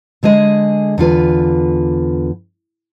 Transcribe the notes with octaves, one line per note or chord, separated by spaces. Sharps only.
D3 G#3 G#4 D#5
E2 D3 F4 B4